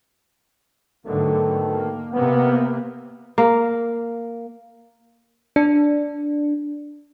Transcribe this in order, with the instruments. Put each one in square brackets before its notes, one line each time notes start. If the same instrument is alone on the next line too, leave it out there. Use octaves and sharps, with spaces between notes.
[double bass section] G#2 D3 F#3 [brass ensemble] B2 D#3 A3
[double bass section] A#3
[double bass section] C3 A#3 [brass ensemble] B3
[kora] A#3
[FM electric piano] D4